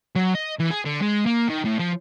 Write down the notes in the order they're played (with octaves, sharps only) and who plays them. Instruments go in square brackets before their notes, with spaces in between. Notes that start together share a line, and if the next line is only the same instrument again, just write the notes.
[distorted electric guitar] F#3
D#5
E3
G#4
D3
G#3
A#3
D#3
A2
F3